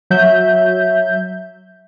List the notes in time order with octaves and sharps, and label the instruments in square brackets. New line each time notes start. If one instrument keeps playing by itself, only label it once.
[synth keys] F#3 E5 G6